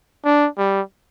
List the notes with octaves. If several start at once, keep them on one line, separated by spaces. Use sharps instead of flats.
D4
G3